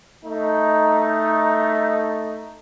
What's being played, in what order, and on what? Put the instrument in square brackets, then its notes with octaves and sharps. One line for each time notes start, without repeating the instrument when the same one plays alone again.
[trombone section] A3 D#4